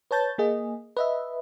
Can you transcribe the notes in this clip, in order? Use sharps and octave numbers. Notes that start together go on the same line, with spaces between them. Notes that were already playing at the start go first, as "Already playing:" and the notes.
B4 C#5 A5 G6 A6
A#3 G#4 D#5
B4 D#5 E5